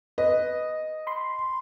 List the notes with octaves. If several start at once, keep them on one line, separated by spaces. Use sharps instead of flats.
B4 D#5
B5 C6